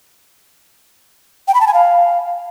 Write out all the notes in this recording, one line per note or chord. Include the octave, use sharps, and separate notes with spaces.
G5
B5
A5
G#5
F5